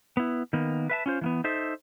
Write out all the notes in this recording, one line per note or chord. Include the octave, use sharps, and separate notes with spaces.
B3 E4
D#3 A#3 B3
B4 E5 A5
C#4 F4 C5
E3 A#3 B3
D#4 A4 C5 E5